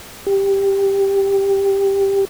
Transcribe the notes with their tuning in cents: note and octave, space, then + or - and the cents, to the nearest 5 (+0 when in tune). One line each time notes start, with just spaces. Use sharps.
G4 +5